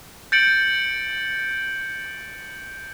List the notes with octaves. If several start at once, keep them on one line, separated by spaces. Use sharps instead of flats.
G6 A6 C#7 D7 F#7